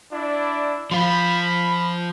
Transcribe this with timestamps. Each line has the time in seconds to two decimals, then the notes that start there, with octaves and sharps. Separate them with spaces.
0.12 D4 E4 D5
0.91 F3 F4 B5